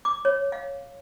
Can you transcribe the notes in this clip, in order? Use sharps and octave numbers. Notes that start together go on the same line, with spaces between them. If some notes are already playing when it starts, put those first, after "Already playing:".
D6
C#5
F5